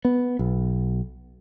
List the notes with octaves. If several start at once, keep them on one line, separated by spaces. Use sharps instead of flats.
B3
B1